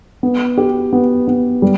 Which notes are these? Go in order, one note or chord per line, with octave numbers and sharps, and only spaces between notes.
B3
G4
B3
B3
G3